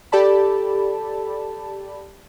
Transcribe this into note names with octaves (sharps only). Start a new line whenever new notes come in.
G4 A4 D5 A5 B5